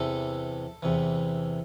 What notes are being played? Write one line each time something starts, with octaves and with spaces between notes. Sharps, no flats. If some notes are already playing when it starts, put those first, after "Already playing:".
Already playing: E2 C3 E3 A4
E2 C3 E3